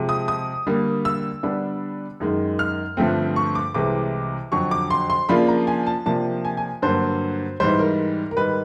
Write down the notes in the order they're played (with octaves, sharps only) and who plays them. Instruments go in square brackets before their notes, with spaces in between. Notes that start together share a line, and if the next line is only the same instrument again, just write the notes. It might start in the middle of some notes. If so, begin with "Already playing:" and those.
Already playing: [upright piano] C3 F3 G#3
D#6
D#6
D3 G3 A#3
E6
D3 G3 B3 D4
F#2 D#3 G#3
F6
G2 D3 F3 A3 C4
C#6
D6
C2 C3 E3 G#3 D6
F2 D3 F#3 C#6
D6
C6
C6
C#3 F3 A#3 D4 F4 B5
A#5
G#5
A5
C3 F3 A#3 D4 A5
G#5
G#5
G2 D3 F#3 A#3 C5
G#2 E3 G3 C5
A#4
A#4
G#2 D#3 G3 B4